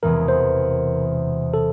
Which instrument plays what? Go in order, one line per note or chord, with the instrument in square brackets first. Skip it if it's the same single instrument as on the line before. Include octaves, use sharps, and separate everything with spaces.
[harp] E1 E2 C3 E3 G#3 [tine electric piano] A#4
[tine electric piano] C5
A4